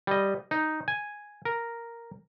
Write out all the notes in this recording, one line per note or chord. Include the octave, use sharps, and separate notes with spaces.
G3 D#5
D#4
G#5
A#4